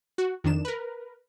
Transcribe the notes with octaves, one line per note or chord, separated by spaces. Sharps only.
F#4
F2 D#3 D4 E7
A#4 B4